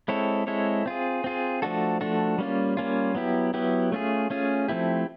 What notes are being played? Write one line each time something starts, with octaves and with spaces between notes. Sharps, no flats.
G#3 C4 E4 A4 C#5
G#3 C4 E4 A4 C#5
C4 F4 G#4
C4 F4 G#4
F3 A3 D4 F#4 A4
F3 A3 D4 F#4 A4
G3 A#3 C#4 F4
G3 A#3 C#4 F4
F#3 B3 E4 G4
F#3 B3 E4 G4
A3 C#4 F4 G#4
A3 C#4 F4 G#4
F3 A3 C4 E4 G4